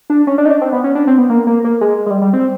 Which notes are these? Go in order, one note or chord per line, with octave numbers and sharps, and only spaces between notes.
D4
C#4
D4
D#4
D4
C4
B3
C#4
D4
C4
B3
A#3
A#3
A#3
G#3
G#3
G3
G3
C4